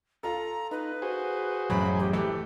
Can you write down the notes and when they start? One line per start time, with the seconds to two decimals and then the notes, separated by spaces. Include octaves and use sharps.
0.23 F4 A4 A#5
0.71 D#4 B4
1.02 F#4 G#4 C5
1.70 A1 F#2 A2 F#3 B5
1.99 G4
2.13 E3 A3 G4 A4